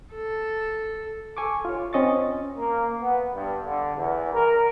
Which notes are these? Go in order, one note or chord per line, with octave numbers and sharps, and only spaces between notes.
A4
A4 G#5 C#6 D6
F4 C#5
C4 C#4 D#5 C#6 A6
A#3
B3
G2
D3
E2
A#4